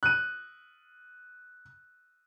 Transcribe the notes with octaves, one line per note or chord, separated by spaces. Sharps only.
F#6 D#7